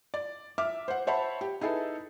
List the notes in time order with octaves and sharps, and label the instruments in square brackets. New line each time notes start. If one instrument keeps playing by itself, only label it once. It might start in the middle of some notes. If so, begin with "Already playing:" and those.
[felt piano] D5
E5 D6 F6
C5 F#5
C5 C#5 E5 F#5 A5 B5
G4
D#4 E4 G#4 A4 B4